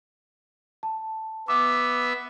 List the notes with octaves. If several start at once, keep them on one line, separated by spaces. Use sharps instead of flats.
A5
B3 E5 D6